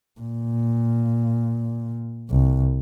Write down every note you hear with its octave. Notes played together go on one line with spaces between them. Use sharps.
A#2
C2